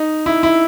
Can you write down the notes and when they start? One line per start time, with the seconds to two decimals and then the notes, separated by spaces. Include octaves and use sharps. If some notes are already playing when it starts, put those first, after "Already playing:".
Already playing: D#4
0.26 E4
0.43 E4